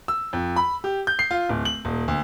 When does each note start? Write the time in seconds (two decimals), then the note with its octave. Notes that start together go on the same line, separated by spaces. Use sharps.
0.08 E6
0.33 F2
0.56 B5
0.84 G4
1.07 G6
1.19 C7
1.31 F4
1.49 D1
1.65 F#7
1.85 D#1
2.08 D2